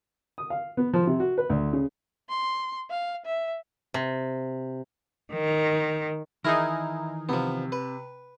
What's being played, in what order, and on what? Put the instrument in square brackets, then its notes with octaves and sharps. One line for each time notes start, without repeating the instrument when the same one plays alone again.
[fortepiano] D#6
F5
B3
F3
C3
F#4
B4
D2
C#3
[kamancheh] C6
F5
E5
[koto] C3
[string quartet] D#3
[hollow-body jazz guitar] D#3 E3 [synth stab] D#4 G#4 A#4 [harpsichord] E4 A#5
[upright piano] C3 [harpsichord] F3 B3
[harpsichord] B4